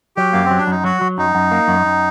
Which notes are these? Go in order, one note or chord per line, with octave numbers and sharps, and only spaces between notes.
F#3 G4
F#2 A#3
C4
F#3
D4
F#2 D#4
F#3 F#4
F#3
F#2 D#4
F#2
A#3
F#2
F#2